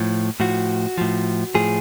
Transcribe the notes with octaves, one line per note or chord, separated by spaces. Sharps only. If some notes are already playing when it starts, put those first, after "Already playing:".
Already playing: A2 F3
A2 F3 F#4
A2 F3
A2 F3 G#4